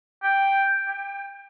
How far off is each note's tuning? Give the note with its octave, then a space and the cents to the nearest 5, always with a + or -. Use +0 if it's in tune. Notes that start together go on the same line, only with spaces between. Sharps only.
G5 +0
G5 +25